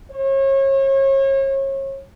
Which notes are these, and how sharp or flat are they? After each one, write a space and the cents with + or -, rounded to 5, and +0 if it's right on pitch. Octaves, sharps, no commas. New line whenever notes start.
C#5 -35